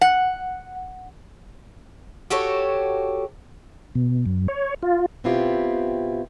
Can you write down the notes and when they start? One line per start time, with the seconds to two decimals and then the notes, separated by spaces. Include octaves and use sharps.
0.01 F#5
2.30 F#4 G4 A4 C#5
3.95 B2
4.26 F#2
4.48 C#5
4.83 F4
5.24 B2 B3 C4 E4 F4 G4